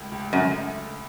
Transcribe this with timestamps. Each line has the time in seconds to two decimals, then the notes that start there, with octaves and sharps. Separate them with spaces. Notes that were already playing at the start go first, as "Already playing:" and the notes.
Already playing: C#2 C#3 A3
0.12 C#2
0.33 F#2
0.40 A3